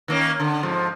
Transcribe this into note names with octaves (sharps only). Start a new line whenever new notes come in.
D#3 A#3 C#4
D3
F2 G#2 F3